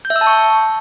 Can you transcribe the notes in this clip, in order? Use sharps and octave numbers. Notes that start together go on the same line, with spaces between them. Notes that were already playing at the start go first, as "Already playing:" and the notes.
G6
E5
E6
A5
C#6